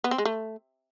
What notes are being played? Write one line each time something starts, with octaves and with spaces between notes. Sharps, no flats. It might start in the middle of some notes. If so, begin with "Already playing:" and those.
B3
C4
G#3
A3